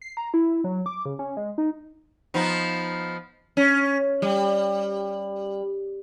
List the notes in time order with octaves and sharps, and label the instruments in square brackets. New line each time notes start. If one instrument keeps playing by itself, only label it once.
[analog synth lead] C7
A#5
E4
F#3
D6
C#3
C#4
G#3
D#4
[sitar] F3 B3 D#4
C#4
G3